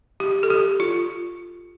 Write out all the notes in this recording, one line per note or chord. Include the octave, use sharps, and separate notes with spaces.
G4
A4
G4
F4